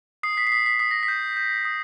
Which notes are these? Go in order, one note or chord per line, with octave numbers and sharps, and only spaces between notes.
D#6 C7
B6
C7
D#6 B6
B6
D#6 B6
A#6
B6
G6
G6
D#6